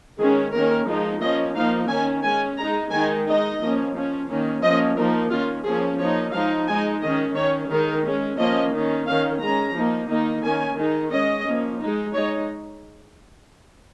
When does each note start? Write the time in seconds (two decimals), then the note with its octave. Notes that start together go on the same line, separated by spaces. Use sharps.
0.18 D#3 G#3 C#4 G#4
0.52 D#3 A#3 C#4 A#4
0.87 F3 G#3 D#4
1.20 F3 A#3 C#4 D#5
1.55 F3 A#3 D#4 F5
1.89 D#3 C#4 G#5
2.23 G#3 C#4 G#5
2.57 G#3 D#4 A#5
2.91 D#3 G#3 D#4 G#5
3.26 G#3 D#4 D#5
3.60 F3 A#3 C#4
3.94 F3 C#4
4.28 D#3 A#3 C#4
4.62 F3 A#3 C#4 D#5
4.97 F3 A#3 D#4 A#4
5.30 D#3 A#3 C#4 F4
5.64 F3 A#3 C#4 G#4
5.99 F3 A#3 D#4 C#5
6.33 F3 G#3 D#4 F5
6.67 G#3 D#4 G#5
7.01 D#3 C#4 D#5
7.35 D#3 C#4 C#5
7.69 D#3 G#3 D#4 A#4
8.04 G#3 C#4
8.37 F3 A#3 C#4 D#5
8.72 D#3 C#4
9.06 D#3 C#4 F5
9.40 G#3 C#4 A#5
9.74 F3 A#3 D#4
10.09 D#3 A#3 D#4
10.43 D#3 A#3 C#4 G#5
10.77 D#3 G#3 D#4
11.11 G#3 C#4 D#5
11.45 F3 A#3 C#4
11.80 G#3 D#4
12.13 G#3 D#4 C#5